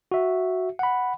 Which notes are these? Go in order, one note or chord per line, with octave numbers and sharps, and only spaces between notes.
F#4 E5
F#5 B5